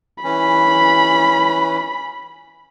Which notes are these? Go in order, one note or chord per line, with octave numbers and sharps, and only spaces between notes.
E3 C#4 B5